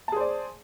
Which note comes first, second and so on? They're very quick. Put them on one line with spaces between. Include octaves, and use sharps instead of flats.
A5 G#4 C5 D5